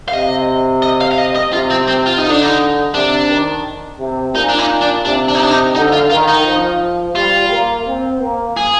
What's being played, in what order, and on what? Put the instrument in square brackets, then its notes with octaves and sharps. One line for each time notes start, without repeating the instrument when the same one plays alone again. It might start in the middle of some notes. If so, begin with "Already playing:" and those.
[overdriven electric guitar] F5
[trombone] C3 [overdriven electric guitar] D#5
[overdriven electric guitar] D#5
F5
F5
D#5
D#5
[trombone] C3 [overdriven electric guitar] F4
[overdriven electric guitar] C4
C4
F4
D#4
[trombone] D3
[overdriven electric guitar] D4
D#4
[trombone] C3 [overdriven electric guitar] D4
[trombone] D#3
C3
[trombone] A#2 [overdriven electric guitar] D#4
[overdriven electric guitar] D4
D#4
D4
[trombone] C3 [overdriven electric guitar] D4
[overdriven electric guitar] D4
D#4
D4
D#4
[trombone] D3 [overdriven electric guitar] D#4
[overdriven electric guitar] F4
[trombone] D#3 [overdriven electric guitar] F4
[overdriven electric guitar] D#4
[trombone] F3
[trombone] G3 [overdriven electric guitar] F4
[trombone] A#3
C4
A#3
[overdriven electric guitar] G#4